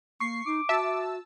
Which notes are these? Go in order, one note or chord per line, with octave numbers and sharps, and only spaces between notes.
A#3 C#6 C7
D#4 D6
F#4 E5 A5 E6